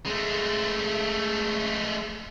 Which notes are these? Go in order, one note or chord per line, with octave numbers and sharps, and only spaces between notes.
G#3 A3